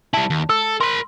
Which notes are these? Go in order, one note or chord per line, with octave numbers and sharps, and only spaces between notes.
G3 E4 A5
D#2
A4 E6
A#4 B5 C6